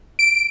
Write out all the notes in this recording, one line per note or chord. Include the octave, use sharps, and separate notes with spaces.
D7